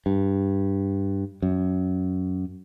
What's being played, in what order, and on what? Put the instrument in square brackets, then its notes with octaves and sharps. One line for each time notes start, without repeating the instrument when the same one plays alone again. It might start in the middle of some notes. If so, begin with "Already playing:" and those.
[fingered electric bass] G2
F#2